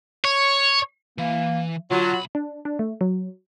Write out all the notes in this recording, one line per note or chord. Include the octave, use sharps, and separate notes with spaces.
C#5
E3 A#3
D3 F#3 F4
B1 B5
D4
D4
A3
F#3